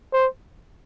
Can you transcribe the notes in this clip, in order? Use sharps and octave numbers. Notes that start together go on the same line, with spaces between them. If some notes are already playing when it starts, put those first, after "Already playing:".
C5